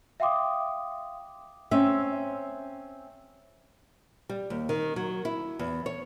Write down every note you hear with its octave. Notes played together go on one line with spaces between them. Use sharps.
E5 F5 G5 C6 D6 D#6
C4 C#4 E5
G3
D#2
D#3
F#3
E4
E2
C#5